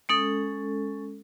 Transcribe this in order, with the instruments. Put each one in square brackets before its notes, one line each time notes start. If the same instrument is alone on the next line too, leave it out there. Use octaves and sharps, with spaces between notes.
[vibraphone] G#3 C#4 A4 [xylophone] D#6 D7